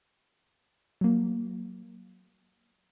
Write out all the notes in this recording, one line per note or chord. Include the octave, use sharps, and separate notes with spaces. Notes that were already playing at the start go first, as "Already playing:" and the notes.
F#3 A#3